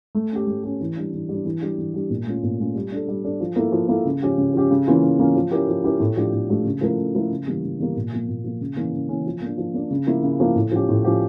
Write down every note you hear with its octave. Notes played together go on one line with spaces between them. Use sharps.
A3
C#4 G4
A3
C#4 G4
E3
G3 D4
E3
G3 D4
E3
G3 D4 G4
E3
G3 D4 G4
A#2
A3 C#4 F4
A#2
A3 C#4 F4
G3
D4 A4
G3
D4 A4
F3
A#3 E4 A4
F3
A#3 E4 A4
C#3
F3 C#4 G4
C#3
F3 C#4 G4
C#3
E3 A#3 C#4 F4
C#3
E3 A#3 C#4 F4
F3
C#4 E4 G4 A#4
F3
C#4 E4 G4 A#4
A2
F3 A3 D4 G4
A2
F3 A3 D4 G4
C#3
F3 A3 E4 A#4
C#3
F3 A3 E4 A#4
C#3
E3 G3 A#3
C#3
E3 G3 A#3
A#2
F3 A#3
A#2
F3 A#3
C#3
E3 A#3 C#4
C#3
E3 A#3 C#4
F3
A#3 D4
F3
A#3 D4
C#3
F3 A#3 E4
C#3
F3 A#3 E4
A2
F3 C#4 G4
A2
F3 C#4 G4